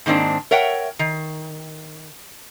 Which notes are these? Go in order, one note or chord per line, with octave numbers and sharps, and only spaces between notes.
G#2 D#3 A#3 C4 D4
A#4 C#5 E5 F#5 G5
D#3